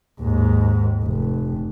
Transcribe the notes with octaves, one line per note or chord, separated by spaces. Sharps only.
D#2 G#2
F1